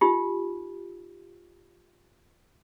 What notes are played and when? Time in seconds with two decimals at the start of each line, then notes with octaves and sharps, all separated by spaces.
0.01 D#4 F4 G4